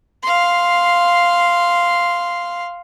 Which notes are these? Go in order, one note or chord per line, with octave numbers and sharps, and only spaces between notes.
F5 C6